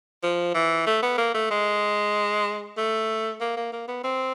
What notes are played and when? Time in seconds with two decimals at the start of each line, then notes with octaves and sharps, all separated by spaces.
0.23 F3
0.54 E3
0.87 A3
1.03 B3
1.18 A#3
1.34 A3
1.51 G#3
2.78 A3
3.41 A#3
3.57 A#3
3.73 A#3
3.88 B3
4.04 C4